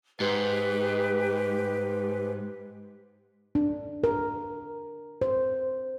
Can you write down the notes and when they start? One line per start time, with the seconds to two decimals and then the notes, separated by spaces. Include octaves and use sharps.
0.20 G#2 G4 B4
3.55 D4
4.04 A#4
5.21 C5